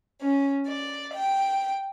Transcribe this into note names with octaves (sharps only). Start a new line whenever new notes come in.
C#4
D5
G5